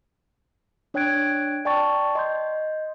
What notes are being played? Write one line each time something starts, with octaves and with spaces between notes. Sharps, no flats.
D4 C#5 G5 F#6 G#6 D7
D5 G5 A5 C#6 A6
D#5 C6 G6